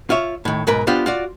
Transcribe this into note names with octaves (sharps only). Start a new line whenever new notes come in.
F4 C#5 E5
A2 D#3
B1 G#2 A#4 B4
B3 D4 F4 G4 C5
F4 F#4 D5